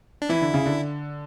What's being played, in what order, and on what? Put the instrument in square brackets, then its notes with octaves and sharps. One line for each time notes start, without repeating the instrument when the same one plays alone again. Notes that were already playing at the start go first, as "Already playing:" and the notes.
[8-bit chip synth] D4
[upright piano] E3 [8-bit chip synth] E4
[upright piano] D3
C#3
D3